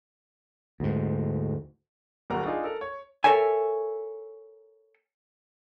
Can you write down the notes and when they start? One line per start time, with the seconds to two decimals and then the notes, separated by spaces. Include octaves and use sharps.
0.80 D2 G#2
2.30 D1 G1 D2 F#3 A#4 A#5
2.46 D4 D#4 F4 G#4
2.64 A4 A#4
2.81 C#5
3.24 A4 A#4 C#5 E5 G#5